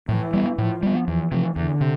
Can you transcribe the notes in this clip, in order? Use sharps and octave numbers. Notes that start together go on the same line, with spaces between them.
A2 E3
G3 B3
A2 F3
G3 B3
E2 E3
C3 F3
E2 D3
C3